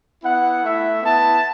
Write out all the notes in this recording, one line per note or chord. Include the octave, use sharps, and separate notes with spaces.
B3 E4 F#5
A3 E4 E5
B3 E4 A5